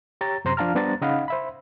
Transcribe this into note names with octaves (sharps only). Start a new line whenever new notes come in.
G4 C#5 A#5 A6
F#2 C3 C5 A#5 C6
F3 D4 F5 A5 A#5 F6
G3 B3 D4 C5 A#5 A6
C#3 D#4 D#5 F5 F#5 B5
C5 E5 B5